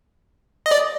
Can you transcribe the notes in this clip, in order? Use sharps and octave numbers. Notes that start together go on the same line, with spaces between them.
D#5
D5